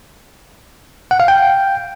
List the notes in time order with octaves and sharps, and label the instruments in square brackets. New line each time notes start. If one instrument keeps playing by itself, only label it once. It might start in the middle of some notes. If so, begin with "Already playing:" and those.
[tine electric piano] F#5
F5
G5